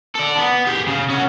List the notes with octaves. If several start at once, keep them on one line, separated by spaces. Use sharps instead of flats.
A4 D5
B3
G4 G#4
C#3
C#4 F#4